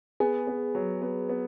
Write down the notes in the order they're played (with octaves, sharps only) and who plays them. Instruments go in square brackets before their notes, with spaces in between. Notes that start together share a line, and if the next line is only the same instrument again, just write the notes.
[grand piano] B3 [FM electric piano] G#4
[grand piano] B3
F#3
B3
B3